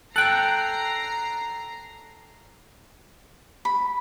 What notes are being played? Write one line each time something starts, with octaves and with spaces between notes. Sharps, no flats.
A4 G5 A#5 F#6 C7
B5